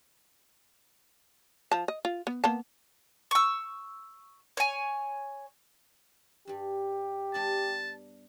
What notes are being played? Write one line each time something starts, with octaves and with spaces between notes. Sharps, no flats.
F3 A5
D#5
F4
B3
A#3 B3 A5
C#6 E6
C#5 G#5
G2 G3 G4
G3 B3 D4 A5